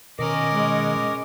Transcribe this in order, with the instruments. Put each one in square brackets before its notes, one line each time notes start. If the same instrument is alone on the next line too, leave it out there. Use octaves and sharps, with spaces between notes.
[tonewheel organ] B2 D#3 [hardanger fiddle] C#4 A#4 [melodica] D#5 D6
[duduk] G#3